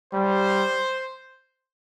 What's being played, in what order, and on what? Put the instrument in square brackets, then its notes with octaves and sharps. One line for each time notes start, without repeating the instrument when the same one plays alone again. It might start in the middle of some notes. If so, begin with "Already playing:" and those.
[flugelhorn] G3 [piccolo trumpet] C5